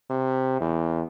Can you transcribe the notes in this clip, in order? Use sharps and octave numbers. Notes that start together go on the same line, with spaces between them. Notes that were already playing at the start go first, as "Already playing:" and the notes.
C3
E2